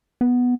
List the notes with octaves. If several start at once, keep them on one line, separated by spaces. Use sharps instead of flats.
B3